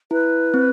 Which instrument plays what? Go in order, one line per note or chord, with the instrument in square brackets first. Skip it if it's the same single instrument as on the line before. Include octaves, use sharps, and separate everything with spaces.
[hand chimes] E4 [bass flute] B4
[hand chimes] C4